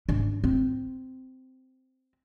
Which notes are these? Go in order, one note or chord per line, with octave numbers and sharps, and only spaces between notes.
G#2 D4
C4